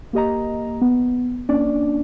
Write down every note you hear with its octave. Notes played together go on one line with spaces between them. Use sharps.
A#3 G4 D#5 A#5
B3
A#3 C#4 D4 D5